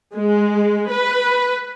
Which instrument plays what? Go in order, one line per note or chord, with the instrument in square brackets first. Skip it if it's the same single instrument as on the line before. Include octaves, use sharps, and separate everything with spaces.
[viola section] G#3
B4